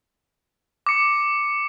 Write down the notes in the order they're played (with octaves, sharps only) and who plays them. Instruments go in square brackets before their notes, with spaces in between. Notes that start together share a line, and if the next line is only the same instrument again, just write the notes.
[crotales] D6 C#7